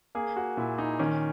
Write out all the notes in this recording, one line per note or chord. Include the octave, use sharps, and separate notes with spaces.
A#3 G#4
F#4
A#2 E4
D#4
D#3 C#4